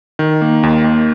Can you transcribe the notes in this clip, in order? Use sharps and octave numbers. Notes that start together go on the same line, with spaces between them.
D#3
A#3
D#2
D#2